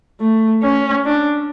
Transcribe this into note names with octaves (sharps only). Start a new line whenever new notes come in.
A3
C#4
D4